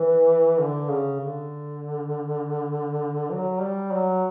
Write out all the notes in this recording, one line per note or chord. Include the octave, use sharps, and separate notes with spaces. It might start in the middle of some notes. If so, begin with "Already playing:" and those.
Already playing: E3
D3
C#3
D3
F#3
G3
F#3